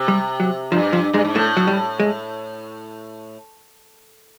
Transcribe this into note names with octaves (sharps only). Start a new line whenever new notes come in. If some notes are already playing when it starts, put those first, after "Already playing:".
Already playing: C3
G3
F#3
G2 F3
F3
G2 G#3
G#2
A2 A3
F#3
G3
G#3